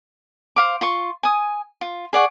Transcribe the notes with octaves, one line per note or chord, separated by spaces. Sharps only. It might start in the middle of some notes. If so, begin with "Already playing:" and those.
C5 F5 D6
F4 C6 C#6
G#5 D#6
F4
G#4 D5 F#5 C#6